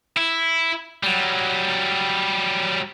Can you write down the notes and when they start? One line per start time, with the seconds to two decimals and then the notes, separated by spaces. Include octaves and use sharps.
0.17 E4
1.03 F#3 G3